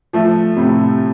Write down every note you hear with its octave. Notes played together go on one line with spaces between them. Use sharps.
F3 A3
A2 C3